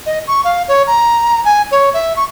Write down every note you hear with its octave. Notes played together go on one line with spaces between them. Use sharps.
D#5
C#6
F5
C#5
A#5
G#5
C#5
E5
C#6